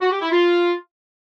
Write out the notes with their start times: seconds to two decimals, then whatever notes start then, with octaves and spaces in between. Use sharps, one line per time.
0.01 F#4
0.11 G4
0.21 E4
0.31 F4